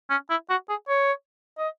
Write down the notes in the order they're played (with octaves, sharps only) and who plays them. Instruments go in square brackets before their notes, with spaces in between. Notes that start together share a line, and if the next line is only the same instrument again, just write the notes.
[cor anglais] C#4
E4
F#4
G#4
C#5
D#5